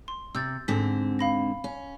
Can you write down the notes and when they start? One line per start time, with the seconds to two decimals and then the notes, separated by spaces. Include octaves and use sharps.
0.08 C6
0.35 C3 E6 G6 A6
0.68 G#2 D3 C4 B6
1.19 F5 B5 A#6
1.64 C#4